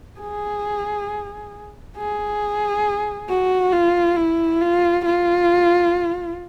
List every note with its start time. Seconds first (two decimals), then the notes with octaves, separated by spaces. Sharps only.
0.20 G#4
1.97 G#4
3.29 F#4
3.72 F4
4.16 E4
4.61 F4
5.05 F4